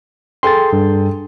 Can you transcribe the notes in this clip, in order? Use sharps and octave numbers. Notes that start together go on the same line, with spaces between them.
G#4 A4 G5 C6 A6
G2